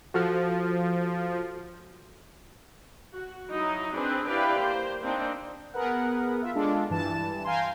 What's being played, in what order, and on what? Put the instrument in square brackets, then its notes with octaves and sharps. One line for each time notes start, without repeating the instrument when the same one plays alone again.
[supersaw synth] F3 [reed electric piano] F#4 A4 F6
[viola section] F#4
F#3 D#4 E4
C4 D4 G#4 B4
E4 G4 B4 D5 F5 G5
A#3 C5
A#3 C4 D4 D#4
[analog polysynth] B3 G#4 A#4 B4 F#5
F4 E5
G#3 D4 F4 A4
G2 E3 A5 E7
F5 G5 G#5 A#5 C6